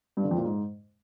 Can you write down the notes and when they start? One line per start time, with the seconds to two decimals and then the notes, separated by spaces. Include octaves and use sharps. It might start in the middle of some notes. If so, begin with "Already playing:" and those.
0.17 G2
0.24 D3
0.31 F2
0.38 A#2
0.45 G#2